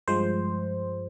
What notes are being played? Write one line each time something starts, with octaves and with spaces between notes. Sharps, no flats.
G2 F3 G#3 C5